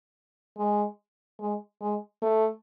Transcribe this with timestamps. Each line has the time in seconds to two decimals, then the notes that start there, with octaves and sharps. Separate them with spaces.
0.57 G#3
1.40 G#3
1.81 G#3
2.22 A3